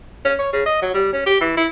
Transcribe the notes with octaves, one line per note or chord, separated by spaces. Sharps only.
C#4
C#5
C#3
D#5
F#3
G3
C#4
G4
E3
E4